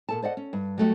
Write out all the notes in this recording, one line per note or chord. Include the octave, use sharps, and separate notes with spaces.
A#2 A4 A5
C5 D5 D#5 F#5
C#4
G2
F#3 G3 A3 E4 F#4 G4